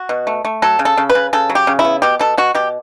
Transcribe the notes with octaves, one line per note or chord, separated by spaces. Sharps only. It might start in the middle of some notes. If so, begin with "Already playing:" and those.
Already playing: F#4
B2
A3
A3
F#3 A4
C#3
A4
C#3
B4
C#3
C#3 A4
F#3
G4
C#3
E4
B3
B2 G4
B2 A4
B2 F#4
B2 G4